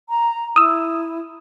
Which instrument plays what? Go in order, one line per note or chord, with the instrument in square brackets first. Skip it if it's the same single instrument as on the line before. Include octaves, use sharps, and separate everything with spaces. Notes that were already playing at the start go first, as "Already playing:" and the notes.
[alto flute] A#5
[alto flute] E4 [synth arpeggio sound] D#6 E6